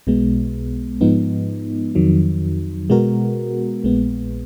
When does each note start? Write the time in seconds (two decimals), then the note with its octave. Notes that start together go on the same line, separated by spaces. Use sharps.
0.07 B1 B2 G#3 B3
1.01 G#2 F3 G#3 B3 D#4
1.95 F2 D#3 F#3
2.90 B2 G#3 B3 F#4 A#4
3.84 A#1 A#2 G#3 B3